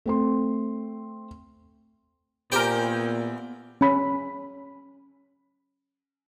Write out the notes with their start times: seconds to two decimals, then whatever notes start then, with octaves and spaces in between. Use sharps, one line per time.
0.06 A3 C4 C6
2.52 A#2 B3 G4 A#4 C5 G5 G#5
3.81 C#4 B5